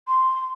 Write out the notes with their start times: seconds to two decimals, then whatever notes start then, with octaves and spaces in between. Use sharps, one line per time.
0.08 C6